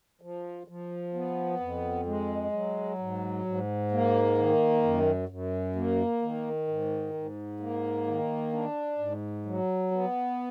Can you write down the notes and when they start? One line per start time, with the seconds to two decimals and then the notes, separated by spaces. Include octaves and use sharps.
0.21 F3
0.68 F3
1.14 B3
1.60 F2
2.06 G#3
2.52 F#3
2.99 G#2
3.45 G#2
3.92 A#3
4.38 D#3
4.83 F#2
5.29 F#2
5.76 A#3
6.22 D#3
6.67 G#2
7.14 G#2
7.60 A#3
8.07 D#3
8.53 D4
8.98 G#2
9.45 F#3
9.91 B3